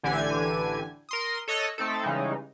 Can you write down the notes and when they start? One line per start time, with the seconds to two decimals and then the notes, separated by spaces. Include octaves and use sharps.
0.03 A1 D3 E3 G4 G#5 G#6
1.09 A#4 C6 D#6
1.48 A4 C#5 D#5 E6 F#6 A#6
1.78 A3 C4 D#4 A4
2.03 C#3 E3 G3 G#3 D#4